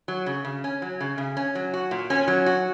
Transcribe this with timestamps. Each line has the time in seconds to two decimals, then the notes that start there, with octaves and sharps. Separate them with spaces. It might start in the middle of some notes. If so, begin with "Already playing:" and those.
0.08 F#3
0.26 C#3
0.45 C#3
0.64 C#4
0.82 F#3
1.01 C#3
1.18 C#3
1.37 C#4
1.55 F#3
1.74 F#4
1.91 A#2
2.10 C#4
2.28 F#3
2.46 F#4